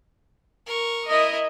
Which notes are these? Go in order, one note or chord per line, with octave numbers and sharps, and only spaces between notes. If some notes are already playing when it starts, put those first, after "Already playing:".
A#4 C#6
E4 A#4 D#5